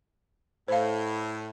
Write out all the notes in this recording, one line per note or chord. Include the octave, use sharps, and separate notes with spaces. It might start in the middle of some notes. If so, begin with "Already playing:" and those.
A2 C5 F5